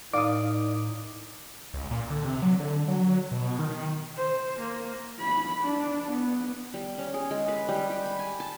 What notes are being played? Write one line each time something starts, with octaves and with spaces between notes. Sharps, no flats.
A2 D#3 D5 F5 D6 D#6
C#2
A#2
D3
C3
F#3
D3
F#3
B2
D#3
C5
A#3
B5
D4
B3
G3
C#4
G#4
G#3
B4
G3
G4
B5
G#5
A5